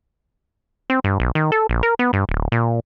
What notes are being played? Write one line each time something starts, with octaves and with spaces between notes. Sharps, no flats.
C4
G2
B1
D#3
A4
A#1
A#4
B3
G2
D1
A#2